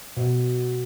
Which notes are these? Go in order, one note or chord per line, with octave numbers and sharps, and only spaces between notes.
B2